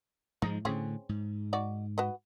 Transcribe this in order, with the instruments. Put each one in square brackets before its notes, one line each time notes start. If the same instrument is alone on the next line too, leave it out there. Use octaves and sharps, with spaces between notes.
[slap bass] G#2 F3 G#3 [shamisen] D#4
[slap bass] A2 D3 [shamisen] C4 C#4 G#4
[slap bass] G#2
[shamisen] D#4 F#4 D5
F#4 B4 D#5